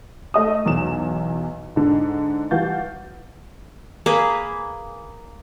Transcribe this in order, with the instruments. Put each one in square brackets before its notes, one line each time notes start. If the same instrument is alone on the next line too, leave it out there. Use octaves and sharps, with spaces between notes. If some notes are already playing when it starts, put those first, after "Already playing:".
[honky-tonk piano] A3 D#5 D#6
B1 E2 F#3 E7
G#2 D3
E3 G3 F#4 F5 G6 A6
[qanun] A#3 G#4 B4